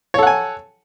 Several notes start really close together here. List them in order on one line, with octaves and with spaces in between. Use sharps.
C#5 A4 F#5 G#5